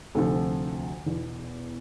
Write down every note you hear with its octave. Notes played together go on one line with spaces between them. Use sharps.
D2 C3 F3 A4
E2 B2